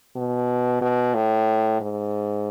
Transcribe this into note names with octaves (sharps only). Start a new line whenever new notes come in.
B2
B2
A2
G#2